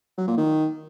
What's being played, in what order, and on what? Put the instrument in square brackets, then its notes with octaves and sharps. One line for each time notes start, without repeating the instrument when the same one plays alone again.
[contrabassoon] F#3
A#2
D#3